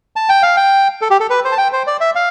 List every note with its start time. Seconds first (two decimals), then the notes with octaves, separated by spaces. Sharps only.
0.16 A5
0.29 G5
0.43 F5
0.57 G5
1.01 A4
1.11 G4
1.20 A4
1.30 B4
1.45 C5
1.52 A5
1.58 G5
1.73 C5
1.87 D5
2.01 E5
2.15 F5